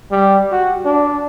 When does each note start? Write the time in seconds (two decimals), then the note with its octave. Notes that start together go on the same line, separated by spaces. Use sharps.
0.11 G3
0.52 F#4
0.85 D4